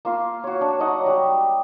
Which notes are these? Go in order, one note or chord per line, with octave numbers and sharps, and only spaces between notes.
A#3 F4 F5
F#4 C#5
D4
F#3 D#4 D#5 F#5
G3 G4